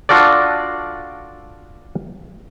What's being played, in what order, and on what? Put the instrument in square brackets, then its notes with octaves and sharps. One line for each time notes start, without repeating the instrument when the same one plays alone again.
[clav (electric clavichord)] D4 F4 F#4 A4 D5